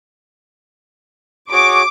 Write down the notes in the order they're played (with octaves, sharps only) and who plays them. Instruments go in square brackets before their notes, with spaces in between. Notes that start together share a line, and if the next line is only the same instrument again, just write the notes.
[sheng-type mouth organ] F#4 G#4 C#5 [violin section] D6